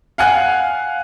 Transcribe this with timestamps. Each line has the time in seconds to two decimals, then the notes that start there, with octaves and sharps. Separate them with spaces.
0.18 F5 F#5 G#5 F#6